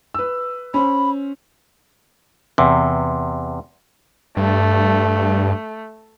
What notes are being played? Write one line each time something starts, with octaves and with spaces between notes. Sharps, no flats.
B4 E6
C#4 C5 B5
E2 C3
G2 A3